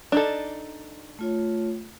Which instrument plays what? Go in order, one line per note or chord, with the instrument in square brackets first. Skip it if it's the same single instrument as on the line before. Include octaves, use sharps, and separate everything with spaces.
[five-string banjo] D4 D#4 A4
[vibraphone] A3 F4 C#5